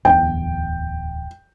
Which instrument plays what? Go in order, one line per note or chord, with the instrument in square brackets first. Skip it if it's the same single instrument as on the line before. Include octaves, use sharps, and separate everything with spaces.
[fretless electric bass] D1 E2 B3 [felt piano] G5